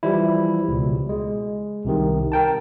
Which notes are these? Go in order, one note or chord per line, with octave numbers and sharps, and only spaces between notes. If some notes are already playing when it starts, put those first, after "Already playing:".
E3 F3 G3 E4
C#2 B2
G#3
C2 C3 D#3
A#4 G5 A5